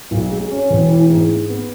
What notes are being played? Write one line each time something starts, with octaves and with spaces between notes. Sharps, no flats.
B1
G#3
C#4
E1
E3
G#2
G#2
B3